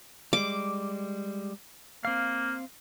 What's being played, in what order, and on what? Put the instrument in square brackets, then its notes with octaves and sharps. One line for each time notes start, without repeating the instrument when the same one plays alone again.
[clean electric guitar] G3 G#3 [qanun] D6
[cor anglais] A#3 [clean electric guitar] C4 F5